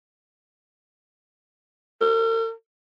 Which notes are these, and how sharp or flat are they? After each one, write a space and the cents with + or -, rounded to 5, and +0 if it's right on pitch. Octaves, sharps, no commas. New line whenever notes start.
A#4 -45